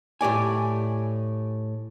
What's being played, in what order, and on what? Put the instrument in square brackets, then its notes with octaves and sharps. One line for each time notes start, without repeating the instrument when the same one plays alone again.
[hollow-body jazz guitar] A2 G4 D5 G#5